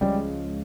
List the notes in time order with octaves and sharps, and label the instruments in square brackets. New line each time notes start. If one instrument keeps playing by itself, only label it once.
[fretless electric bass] C#2 C#3 F3 G#3 [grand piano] G3